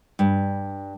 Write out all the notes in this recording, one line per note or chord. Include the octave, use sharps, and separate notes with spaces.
G2